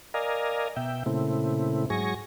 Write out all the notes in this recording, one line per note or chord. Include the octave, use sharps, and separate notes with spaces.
A#4 D5 D#5 F5 G#5 A#5
B2 E5 G5
A#2 C#3 A3 C4 E4
G#2 F#3 G#4 G#5 C#6 A#6